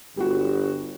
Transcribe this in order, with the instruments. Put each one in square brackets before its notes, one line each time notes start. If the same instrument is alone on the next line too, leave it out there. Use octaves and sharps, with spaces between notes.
[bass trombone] G1 [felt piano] G3 F#4